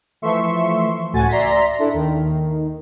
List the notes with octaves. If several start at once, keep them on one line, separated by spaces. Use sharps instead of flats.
E3 F3 A3 E5 C6 C#6
C#2 A2 A3 F#4 G#5 A6
D5 E5 A#5 C6 A#6 B6
D4 E4 A4
D#2 D#3